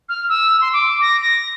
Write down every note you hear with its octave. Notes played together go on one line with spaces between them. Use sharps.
F6
E6
C6
D6
A#6
A#6